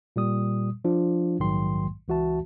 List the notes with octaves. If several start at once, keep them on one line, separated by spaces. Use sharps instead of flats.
A#2 G3 D#6
F3 D4 F4
A#1 G#2 D#3 F#3 G5 C6
C#2 E3 F#4 E5 A5